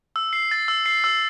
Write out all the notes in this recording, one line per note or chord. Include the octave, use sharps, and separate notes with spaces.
E6
C7
A6
E6
C7
E6